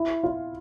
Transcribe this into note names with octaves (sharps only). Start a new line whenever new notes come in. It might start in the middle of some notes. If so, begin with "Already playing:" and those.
Already playing: E4
F4